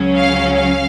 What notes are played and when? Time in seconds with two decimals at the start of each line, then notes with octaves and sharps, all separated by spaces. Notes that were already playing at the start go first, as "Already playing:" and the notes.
Already playing: C#2 C#3 F#3 C#4
0.17 F5
0.57 F5